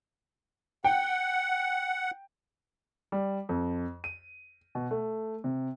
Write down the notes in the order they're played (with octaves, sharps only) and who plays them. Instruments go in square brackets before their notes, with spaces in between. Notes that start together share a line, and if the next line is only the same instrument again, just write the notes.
[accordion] F#5 [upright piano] G5
[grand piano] G3
F2
D#7
B2
A3
C3